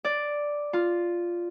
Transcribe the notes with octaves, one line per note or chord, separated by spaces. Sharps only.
D5
F4